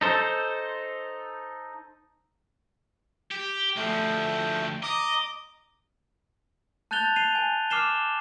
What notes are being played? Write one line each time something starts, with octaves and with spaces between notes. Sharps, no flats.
D#4 A4 C5
G4
D2 F3 A3 G5
D#5 A#5 D6 D#6
A5 F#6 G6 A6 F7 G7
C7 D#7 F7
G#5
D6 F6 C7 E7 G7